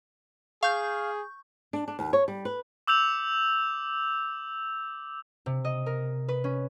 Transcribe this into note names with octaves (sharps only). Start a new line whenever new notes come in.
G#4 F5 C#6 G6
D4
D4
D#2
C#5
G3
B4
D6 E6 G6 F7
C3
D#5
A#4
B4
C#4